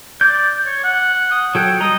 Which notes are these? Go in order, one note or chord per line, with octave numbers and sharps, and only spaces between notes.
D5 G6
C#5
F#5
D#6
F#3 A4 C#5 G5
G3 D#5 A#5 D#6